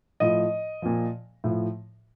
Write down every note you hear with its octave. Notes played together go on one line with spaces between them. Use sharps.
A2 F3 D#5
A#2 F3
A2 F3